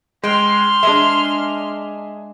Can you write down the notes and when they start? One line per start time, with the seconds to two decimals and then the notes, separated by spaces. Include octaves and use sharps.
0.23 G#3 G5 C6 F6
0.83 G#3 D4 G#4 D#5 E5